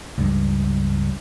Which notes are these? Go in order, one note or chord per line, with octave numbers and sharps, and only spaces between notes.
C#2 G2